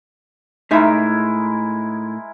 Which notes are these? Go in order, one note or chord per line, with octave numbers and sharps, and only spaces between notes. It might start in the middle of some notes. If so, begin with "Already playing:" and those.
A2 G#3 D#4 E4 A#4 E5